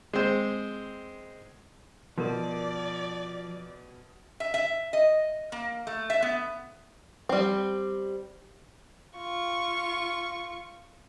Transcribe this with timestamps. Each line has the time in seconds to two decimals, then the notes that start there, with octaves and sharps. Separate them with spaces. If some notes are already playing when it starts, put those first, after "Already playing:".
0.13 G#3 C4
2.18 B2 F3 F#4 A4 A#4 D5
4.40 E5
4.54 E5
4.93 D#5
5.52 A#3
5.87 A3
6.10 E5
6.22 B3
7.29 G3 C4
9.17 F4 C#6